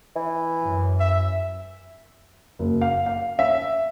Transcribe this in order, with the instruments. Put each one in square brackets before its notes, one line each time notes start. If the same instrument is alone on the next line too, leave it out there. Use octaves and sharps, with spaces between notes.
[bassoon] E3
[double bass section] F#2
[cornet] E5
[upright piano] F#1
F5
F5
E5